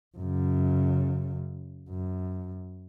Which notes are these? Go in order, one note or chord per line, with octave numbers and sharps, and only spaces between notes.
F#2 C#3
F#2